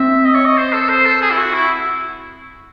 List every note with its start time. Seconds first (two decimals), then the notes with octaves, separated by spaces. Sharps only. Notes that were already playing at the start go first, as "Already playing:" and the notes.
Already playing: C4 E5
0.25 D#5
0.35 C#5
0.45 D#5
0.57 C5
0.73 A4
0.90 C5
1.06 A4
1.22 G#4
1.31 E4
1.37 F#4
1.53 E4